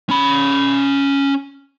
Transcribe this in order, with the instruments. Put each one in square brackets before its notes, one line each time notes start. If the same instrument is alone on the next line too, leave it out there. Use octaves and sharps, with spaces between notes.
[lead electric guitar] C#4 B5